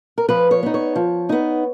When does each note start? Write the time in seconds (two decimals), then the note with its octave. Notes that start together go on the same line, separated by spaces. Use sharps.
0.18 A#4
0.29 F3 B4
0.51 C#5
0.63 B3 D#4
0.74 C#5
0.96 F3
1.29 B3 D#4